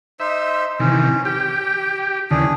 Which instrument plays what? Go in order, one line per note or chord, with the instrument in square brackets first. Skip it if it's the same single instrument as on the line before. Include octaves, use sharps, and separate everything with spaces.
[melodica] D#4 C5 [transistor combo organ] E5
[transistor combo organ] C3 D#3 E3 [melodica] C#4
[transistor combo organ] G4 [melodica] G5
[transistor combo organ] D#2 C#3 E3 [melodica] D4 G#4